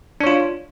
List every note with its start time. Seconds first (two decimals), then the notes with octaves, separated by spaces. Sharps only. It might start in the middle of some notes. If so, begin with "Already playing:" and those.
0.20 D4
0.24 C#5
0.27 F4